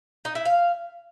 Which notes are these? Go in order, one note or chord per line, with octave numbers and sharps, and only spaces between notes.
D#4
E4
F5